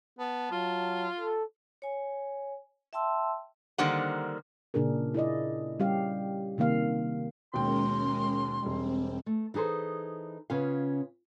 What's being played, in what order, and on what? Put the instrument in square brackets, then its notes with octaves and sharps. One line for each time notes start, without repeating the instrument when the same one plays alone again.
[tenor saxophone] B3 [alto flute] A5
[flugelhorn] F#3 [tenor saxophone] F4
[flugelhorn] A4
[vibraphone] C#5 G#5
E5 G5 A5 C6 E6
[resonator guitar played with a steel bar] D3 D#3 G3 A#3 C5 F#5
[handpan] A#2 C#3 D4 G#4 A#4
E4 G#4 D5 D#5
G3 C#4 G4 F5
C3 D#3 A#3 F5
[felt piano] D#2 B2 G5 [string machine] G#3 C#4 A#4 [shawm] C6
[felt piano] E1 G3 [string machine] C4
[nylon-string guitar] A3
E3 D#4 G#4 A4 C5
C#3 B3 C#4 F4 F5